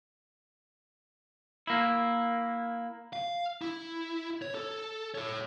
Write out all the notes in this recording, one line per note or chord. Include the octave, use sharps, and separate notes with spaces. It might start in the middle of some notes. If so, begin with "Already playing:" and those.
A#3 E4
F5
E4
C#5
A4
A4 C#5